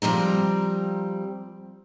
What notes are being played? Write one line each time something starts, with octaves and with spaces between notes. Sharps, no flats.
F3 G3 C4 A#5